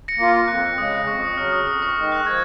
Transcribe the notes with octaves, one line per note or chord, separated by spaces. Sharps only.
A#6 C#7
A#3 F4
F2 F#6
C#3 G#3 D#6
F2 C#6
D#6
C#3 F#3 F6
D#6
F2 D#6
C#6
D#3 G#3 D#6
F#6
F3 G#6